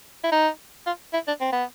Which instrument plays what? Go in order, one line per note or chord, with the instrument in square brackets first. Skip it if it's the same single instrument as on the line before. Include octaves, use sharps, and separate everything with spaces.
[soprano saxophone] E4
D#4
F4
E4
D4
C4
B3